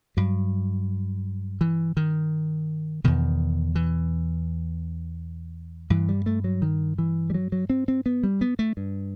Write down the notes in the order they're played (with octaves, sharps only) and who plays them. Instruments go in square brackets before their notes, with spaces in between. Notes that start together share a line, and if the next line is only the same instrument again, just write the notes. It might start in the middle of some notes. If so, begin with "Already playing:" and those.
[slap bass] G2 F#3
E3
D#3
E2 B2 D#3
E3
G2 E3
G3
A3
F#3
D#3
E3
G3
F#3
F#3
C4
C4
B3
G3
B3
A3
G2